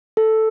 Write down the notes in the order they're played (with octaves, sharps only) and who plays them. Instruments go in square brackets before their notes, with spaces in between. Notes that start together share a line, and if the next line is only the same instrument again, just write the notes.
[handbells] A4